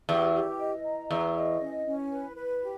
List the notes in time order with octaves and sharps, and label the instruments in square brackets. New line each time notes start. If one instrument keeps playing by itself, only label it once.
[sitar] E2 [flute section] G4
[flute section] G4
D#5
A#5
[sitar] E2 [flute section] G#4
[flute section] D#5
C#4
C#4
B4
B4
G4